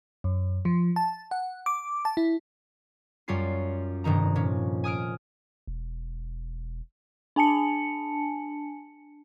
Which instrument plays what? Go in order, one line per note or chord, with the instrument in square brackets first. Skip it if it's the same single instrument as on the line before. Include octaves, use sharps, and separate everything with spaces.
[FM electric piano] F#2
F3
A5
F#5
D6
A5
E4
[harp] F#2 G3 C#4 F4 C7
F1 G2 D#3 A#5
A#2 C#4
G#5 D#6 F6 D7
[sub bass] E1
[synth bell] D4 G#5 A5 C#7